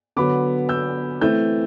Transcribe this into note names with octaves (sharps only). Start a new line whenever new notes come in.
D3 F#3 B3 B5 D6
E6 G6
E3 A3 C4 E4 E6 G6